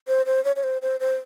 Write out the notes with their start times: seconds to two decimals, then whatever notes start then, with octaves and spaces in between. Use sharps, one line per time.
0.08 C5
0.26 C5
0.45 C#5
0.56 C#5
0.63 C5
0.82 C5
1.00 C5